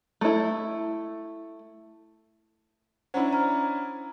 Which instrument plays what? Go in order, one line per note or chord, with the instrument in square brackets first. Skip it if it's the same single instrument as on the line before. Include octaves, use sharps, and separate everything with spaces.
[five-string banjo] A3 E4
[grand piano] C#4 D4 E4 [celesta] C5 F#5 A#5
[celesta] A#5 F6